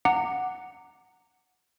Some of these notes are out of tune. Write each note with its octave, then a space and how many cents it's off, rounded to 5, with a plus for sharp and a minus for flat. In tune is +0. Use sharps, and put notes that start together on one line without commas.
F#5 +0 A#5 -20 D6 +0